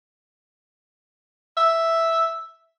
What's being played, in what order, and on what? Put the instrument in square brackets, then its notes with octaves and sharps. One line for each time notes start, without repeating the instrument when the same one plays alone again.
[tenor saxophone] E5